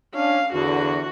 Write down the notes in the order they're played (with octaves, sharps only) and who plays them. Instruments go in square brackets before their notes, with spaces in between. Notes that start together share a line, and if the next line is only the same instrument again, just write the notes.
[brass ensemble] C#4 D4 [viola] F5
[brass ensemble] E2 D3 [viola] F#4